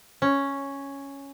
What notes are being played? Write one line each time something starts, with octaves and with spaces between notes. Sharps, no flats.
C#4